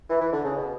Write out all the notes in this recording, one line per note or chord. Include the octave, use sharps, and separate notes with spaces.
E3
E3
D3
C#3
B2